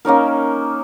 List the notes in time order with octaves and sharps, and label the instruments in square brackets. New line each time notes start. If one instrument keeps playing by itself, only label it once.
[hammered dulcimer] A#3 C#4 D#4 A#4